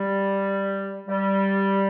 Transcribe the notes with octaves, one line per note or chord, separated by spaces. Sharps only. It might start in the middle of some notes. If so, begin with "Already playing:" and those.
Already playing: G3
G3